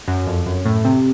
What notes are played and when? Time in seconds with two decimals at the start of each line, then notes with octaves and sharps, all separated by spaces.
0.08 F#2
0.27 F2
0.46 F#2
0.65 A2
0.85 C3